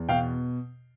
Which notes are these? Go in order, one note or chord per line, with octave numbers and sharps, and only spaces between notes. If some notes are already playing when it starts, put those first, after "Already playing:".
Already playing: E2
B2 F5 G5